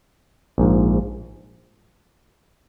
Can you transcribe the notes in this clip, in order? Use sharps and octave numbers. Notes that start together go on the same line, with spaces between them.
A#1 G#2 F3